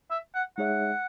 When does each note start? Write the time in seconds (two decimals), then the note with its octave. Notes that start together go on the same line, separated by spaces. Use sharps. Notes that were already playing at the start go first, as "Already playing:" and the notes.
0.11 E5
0.34 F#5
0.57 G#3 D#4 G#4 C#5 E5 F#5